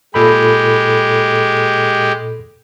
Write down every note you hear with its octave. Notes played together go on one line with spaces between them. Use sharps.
A#2 G#3 G4 A4 B5